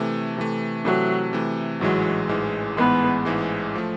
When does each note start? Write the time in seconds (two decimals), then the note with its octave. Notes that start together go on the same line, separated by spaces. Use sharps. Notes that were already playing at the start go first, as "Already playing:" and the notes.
Already playing: C3 E3 A3
0.37 C3 E3 A3
0.85 C3 E3 F#3 A3
1.33 C3 E3 A3
1.81 A1 G#2 E3 F#3 G#3
2.29 A1 G#2 E3 G#3
2.77 A1 G#2 E3 G#3 B3
3.25 A1 G#2 E3 G#3
3.75 F3 A3